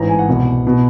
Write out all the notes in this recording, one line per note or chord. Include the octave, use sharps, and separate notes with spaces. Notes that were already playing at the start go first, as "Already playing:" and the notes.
Already playing: A1 G#2 E3 A#5
G#5
F#5
C2 B2
B2